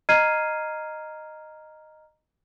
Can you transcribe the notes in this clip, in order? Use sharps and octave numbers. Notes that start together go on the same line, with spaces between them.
D#5 A#5 F6 G#6 C7 D#7